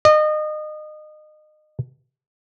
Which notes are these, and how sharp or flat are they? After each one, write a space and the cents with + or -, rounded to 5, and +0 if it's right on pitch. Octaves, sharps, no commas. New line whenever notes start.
D#5 -30